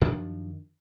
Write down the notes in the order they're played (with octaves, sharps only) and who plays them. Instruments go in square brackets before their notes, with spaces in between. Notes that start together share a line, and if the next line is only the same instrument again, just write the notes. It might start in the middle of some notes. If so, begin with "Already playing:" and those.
[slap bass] F#2 D#3 F3 D4